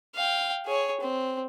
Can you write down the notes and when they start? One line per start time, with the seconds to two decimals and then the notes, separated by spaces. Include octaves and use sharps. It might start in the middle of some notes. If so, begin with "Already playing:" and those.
0.15 F5 G5
0.66 G#4 C#5
1.01 C4